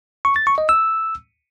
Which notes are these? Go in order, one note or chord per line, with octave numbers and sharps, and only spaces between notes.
C#6
A6
C#6
D#5
E6